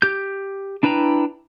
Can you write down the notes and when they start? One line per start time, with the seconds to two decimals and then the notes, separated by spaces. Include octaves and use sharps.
0.02 G4 G6
0.83 D4 E4 B4 G5 A#5